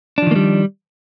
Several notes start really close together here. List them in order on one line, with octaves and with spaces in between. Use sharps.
D4 F3 D#3 A#3 G3